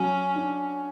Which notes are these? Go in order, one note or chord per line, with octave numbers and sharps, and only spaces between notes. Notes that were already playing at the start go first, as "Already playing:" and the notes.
Already playing: F#3 C#4
D4